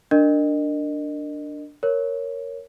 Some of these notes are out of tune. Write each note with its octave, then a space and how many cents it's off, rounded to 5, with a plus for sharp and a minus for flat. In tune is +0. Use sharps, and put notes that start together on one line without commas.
D4 +0 A#4 -15 D#5 -25
A#4 +0 C#5 +0